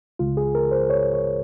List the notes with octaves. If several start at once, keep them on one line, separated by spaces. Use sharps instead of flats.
C#2 C#3 G#3 F4
G#4
A#4
C5
C#5
C#5